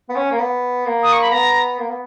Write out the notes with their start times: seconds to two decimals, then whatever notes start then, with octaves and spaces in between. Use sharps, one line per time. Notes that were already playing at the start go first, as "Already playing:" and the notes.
0.09 B3
0.16 C#4
0.31 A#3
0.39 B3
0.86 A#3
1.03 D#6
1.13 C#6
1.22 B5
1.32 B3 A#5
1.79 A#3
1.89 B3